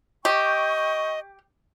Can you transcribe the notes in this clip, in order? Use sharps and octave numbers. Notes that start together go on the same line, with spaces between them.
G4 D#5 G5 C#6